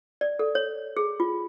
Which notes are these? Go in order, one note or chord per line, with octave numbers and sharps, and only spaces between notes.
D5
A4
C#5
G#4
F4